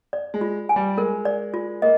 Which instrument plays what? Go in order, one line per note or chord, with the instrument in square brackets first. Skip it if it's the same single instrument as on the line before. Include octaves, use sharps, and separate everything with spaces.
[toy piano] D5
[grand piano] G#3
[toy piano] F4
G#5
[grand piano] G3
[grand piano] G#3 [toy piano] A#4
[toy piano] D5
F4
[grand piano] A#3 [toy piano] D#5